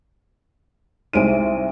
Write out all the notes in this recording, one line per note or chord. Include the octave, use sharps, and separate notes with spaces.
C2 G#3 D#4 C5 D7 D#7